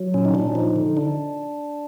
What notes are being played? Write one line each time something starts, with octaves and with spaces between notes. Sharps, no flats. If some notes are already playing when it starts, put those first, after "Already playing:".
Already playing: F#3
A#2 C#4
D#4
A#2 D4
F3 D#4
D3
D4